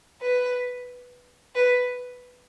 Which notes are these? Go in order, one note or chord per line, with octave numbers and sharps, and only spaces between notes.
B4
B4